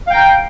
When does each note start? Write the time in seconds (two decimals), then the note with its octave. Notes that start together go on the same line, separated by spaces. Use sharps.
0.07 F5
0.10 G5
0.13 A#5